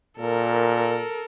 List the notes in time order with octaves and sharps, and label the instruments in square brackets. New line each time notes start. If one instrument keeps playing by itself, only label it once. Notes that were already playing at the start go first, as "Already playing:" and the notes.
[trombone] A#2 [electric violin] A4 A#4